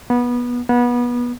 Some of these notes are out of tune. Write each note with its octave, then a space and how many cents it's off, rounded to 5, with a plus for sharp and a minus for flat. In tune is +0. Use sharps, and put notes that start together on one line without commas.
B3 -20
B3 -25